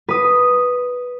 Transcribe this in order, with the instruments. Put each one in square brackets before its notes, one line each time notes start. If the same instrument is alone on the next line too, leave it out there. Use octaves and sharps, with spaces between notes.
[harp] B4 D#6